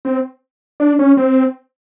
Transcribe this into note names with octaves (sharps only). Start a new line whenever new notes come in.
C4
D4
C#4
C4